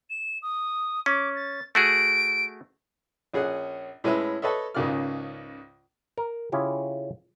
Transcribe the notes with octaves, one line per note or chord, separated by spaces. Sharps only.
E7
D#6
C#4 D6
A6
A3 F#4 G#4 D7
A#1 C#4 G#4 F#5
A2 G#3 C#4 B4 E5
A4 B4 C#5 D#5 E5
C#2 G#2 C#3 A#3 D5 F6
A#4
C#3 C#4 E4 F4 G4